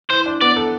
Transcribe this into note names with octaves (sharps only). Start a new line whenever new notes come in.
E3 C5
D4
B3 D5
A4